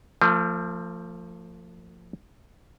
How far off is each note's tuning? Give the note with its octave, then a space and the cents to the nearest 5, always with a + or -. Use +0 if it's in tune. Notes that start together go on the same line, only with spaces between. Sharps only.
F3 +0 A3 +45